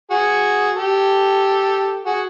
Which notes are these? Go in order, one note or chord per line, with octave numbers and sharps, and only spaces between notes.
F#4 G#4
G4 A4
F#4 G#4